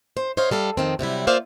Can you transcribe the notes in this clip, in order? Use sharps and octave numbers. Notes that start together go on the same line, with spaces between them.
C5
C5 C#5 D#5 F5
G3 A4 F5
F2 D#3 C4
C3 F#3 G3 E4
A#3 F4 C5 D5 E5 F5